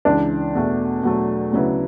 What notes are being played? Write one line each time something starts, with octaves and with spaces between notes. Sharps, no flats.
C#2 C#3 E3 D4
E2 B2 A3
E2 B2 F#3 A3
D2 C#3 F#3 B3 E4